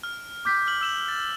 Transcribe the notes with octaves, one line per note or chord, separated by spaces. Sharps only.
F6
D6 G6 B6
F6 F#7
E6 E7 F#7
A6